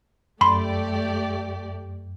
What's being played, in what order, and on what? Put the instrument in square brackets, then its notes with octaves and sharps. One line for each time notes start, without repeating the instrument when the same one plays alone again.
[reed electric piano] F#2 [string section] A3 G4 D5 [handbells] B5 C6